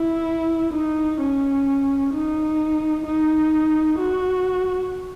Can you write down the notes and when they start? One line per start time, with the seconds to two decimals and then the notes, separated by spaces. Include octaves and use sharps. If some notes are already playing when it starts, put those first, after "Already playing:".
Already playing: E4
0.73 D#4
1.20 C#4
2.14 D#4
3.06 D#4
3.99 F#4